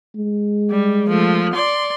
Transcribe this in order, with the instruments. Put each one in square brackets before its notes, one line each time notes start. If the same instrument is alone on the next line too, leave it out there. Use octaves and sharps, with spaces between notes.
[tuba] G#3
[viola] G3
F3 A3
D5 C6